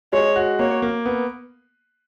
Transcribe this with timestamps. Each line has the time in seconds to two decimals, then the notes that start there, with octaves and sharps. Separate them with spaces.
0.13 G#3 C#5
0.36 F#4
0.59 A#3 C#5
0.82 A#3
1.05 B3